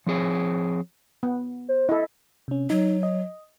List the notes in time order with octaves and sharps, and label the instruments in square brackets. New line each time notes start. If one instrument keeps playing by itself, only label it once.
[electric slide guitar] F3 C4 G#4 C#5
[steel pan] B3
[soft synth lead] C5
[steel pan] E4 A4 [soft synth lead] D#5
[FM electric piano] C3 C#4
[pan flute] F#3 [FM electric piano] D#4
[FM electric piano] D#5